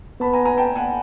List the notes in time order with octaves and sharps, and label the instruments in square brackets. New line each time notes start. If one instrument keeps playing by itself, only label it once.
[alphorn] B3 [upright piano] A5 B5
[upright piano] G#5 A#5
G#5 A#5
G5 A5
F#5 G#5